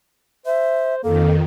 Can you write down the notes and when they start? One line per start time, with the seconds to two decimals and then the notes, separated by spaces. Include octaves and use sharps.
0.46 C5 E5
1.04 F2 D#3 A#3 A4